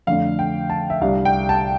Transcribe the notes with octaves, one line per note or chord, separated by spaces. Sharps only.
F2 D3 A3 D4 F5
G5
A5
E5
C2 C3 G3 D4 F5
G5
A5